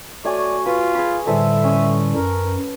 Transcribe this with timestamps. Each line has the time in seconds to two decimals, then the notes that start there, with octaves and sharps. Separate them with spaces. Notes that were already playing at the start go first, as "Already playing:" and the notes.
0.24 A3 F#4 C#5 D5 G#5
0.66 F4 B4
0.95 G#4 B5
1.27 A2 D3 G3 A4 B4 C5 E5
1.64 C#4 D#6
2.15 F#2 A#4